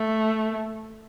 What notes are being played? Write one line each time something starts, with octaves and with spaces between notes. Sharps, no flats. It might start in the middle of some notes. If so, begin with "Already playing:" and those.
Already playing: A3